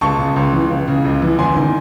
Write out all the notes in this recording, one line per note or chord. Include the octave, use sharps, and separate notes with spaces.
C#2 A5 C#6
C#3
C#2
E3
C#2
C#3
C#2
E3
E2 G#5 C6
D#3